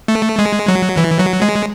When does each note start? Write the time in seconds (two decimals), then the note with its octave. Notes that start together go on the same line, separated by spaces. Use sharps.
0.08 A3
0.39 G#3
0.68 F#3
0.97 E3
1.19 F#3
1.42 G#3